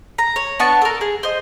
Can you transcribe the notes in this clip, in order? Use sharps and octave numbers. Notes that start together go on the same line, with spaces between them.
A#5
C#5
B3 D4 A5 C#6
A4 A#4
G#4
C5 D#5